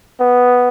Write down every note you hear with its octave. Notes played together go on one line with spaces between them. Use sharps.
B3